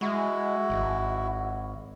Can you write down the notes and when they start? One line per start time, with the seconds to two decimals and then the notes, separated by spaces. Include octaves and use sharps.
0.01 G#3 E4 F#4
0.70 G#1